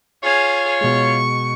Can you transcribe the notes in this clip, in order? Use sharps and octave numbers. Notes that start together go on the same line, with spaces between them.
F4 G#4 C#5 F5
B2 G#3 C#6